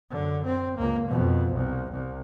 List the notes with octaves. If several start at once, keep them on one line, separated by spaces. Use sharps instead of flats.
F#2 D3
C4
C#2 A#3
F2 B2
C2
C2